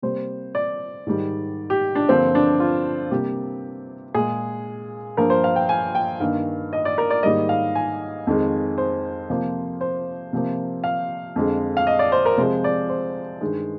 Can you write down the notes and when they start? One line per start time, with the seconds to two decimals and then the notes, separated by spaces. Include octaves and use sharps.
0.02 C3 G3 A#3 C5
0.55 D5
1.07 G#2 D#3 G3
1.70 G4
1.95 D4
2.09 G2 D3 F3 A#3 C4
2.35 D4
2.60 F4
3.11 C3 G3 A#3 G4
4.14 A#2 G#3 G#4
5.17 G2 F3 A#3 A#4
5.30 C5
5.44 F5
5.56 G5
5.69 G#5
5.95 G5
6.20 G2 D#3 A#3 F5
6.73 D#5
6.85 D5
6.98 A#4
7.10 D5
7.23 G#2 D#3 G3 A#3 D#5
7.49 F5
7.75 G#5
8.27 F2 D#3 G#3
8.78 C5
9.30 C3 F3 A#3
9.81 C5
10.33 C3 F3 A#3
10.84 F5
11.36 F2 D3 G#3
11.77 F5
11.87 D#5
11.99 D5
12.12 C5
12.26 A#4
12.38 C3 F3 G#3 C5
12.64 D5
12.89 C5
13.41 G2 D#3 G#3